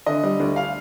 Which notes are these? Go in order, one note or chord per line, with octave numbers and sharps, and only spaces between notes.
D3 D#5
G3
D2
F5